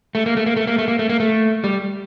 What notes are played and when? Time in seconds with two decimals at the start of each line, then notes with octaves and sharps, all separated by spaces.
0.15 A3
0.26 A#3
0.37 A3
0.46 A#3
0.57 A3
0.67 A#3
0.78 A3
0.88 A#3
0.99 A3
1.09 A#3
1.20 A3
1.64 G3